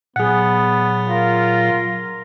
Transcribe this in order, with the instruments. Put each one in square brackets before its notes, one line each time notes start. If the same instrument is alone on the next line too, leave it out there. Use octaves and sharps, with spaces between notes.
[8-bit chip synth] A#2 F#3 [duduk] B3 [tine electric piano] G#4 F#5
[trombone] F4 [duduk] A#4